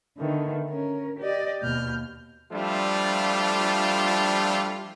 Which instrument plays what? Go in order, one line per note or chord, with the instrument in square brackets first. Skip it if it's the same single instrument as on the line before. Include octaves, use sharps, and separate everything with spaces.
[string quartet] D3 D#3 A3 B3
C#4 A#4
G4 D5 D#5
D#2 B2 F6 G6
[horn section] F3 G3 A3 D4 E4 F4